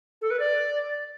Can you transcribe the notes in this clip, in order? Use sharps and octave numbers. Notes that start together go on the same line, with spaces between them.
A4
B4
D5